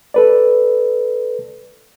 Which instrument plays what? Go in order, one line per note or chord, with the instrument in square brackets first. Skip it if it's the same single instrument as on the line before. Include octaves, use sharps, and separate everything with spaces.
[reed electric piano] A4 B4 D5